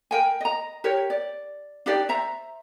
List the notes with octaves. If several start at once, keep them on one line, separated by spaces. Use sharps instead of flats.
A#4 G5 G#5
D#5 A#5
G4 A#4 C#5
D5
D4 D#4 G4 D5
C5 E5 A#5